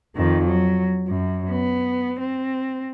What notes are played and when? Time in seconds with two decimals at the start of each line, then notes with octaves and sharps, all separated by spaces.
0.16 F2 D#3
0.45 F#3
1.08 F#2
1.51 B3
2.20 C4